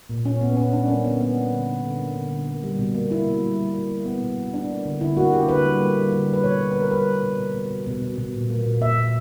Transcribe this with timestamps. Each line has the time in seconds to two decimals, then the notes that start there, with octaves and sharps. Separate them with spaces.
0.10 A#2
0.25 A#2 C#4
0.41 A#2 B3
0.57 A#2 C#4
0.73 G3 D4
0.88 A#3 C#4
1.05 D3 B3
1.20 A#3 B3
1.36 G3
1.52 D3
1.68 D3
1.84 D3
2.00 A#3
2.16 D3
2.31 D3
2.47 A#3
2.63 G3
2.79 B2
2.95 A#3
3.11 A#3 E4
3.27 B2
3.42 G3
3.58 A#3
3.74 A#3
3.90 B2
4.06 A#3 B3
4.22 B2
4.38 B2
4.54 G3 D4
4.70 A#3
4.85 D3
5.01 D3 E4
5.17 A#3 F#4
5.33 D3 G4
5.49 D3 B4
5.65 G3
5.81 A#3
5.96 G3
6.13 D3
6.28 G3
6.34 B4
6.44 B2 C#5
6.60 B2
6.71 B4
6.76 B2 A#4
6.91 G3 B4
7.07 A#3
7.23 B2
7.39 B2
7.55 B2
7.71 B2
7.86 B2
8.02 B2
8.18 B2
8.34 A#2
8.50 A#3
8.66 A#2
8.81 A#2 E5
8.97 A#2